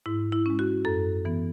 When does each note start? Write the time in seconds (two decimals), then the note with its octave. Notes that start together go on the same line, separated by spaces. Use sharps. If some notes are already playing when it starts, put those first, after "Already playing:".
0.06 G#2 E4
0.32 E4
0.46 G#3 C#4
0.59 F#4
0.85 F#2 A4
1.25 E3 B3